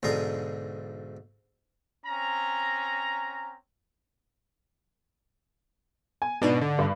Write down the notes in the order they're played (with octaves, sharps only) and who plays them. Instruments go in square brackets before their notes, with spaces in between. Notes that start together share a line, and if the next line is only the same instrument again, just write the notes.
[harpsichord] B1 G#2 D3 G#4 A#5 C6
[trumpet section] C4 C#4 A#5
[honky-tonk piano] G#5
[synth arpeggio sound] G#2 D4 D#4 [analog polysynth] B2 [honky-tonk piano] D5
[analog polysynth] D3
[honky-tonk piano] G2